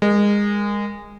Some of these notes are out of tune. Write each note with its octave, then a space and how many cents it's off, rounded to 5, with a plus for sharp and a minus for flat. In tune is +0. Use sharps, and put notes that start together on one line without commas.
G#3 -20 A#4 +0